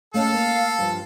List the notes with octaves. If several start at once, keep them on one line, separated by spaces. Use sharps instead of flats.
A3 C#4 A4 D#5 F5
A#3
G2 F3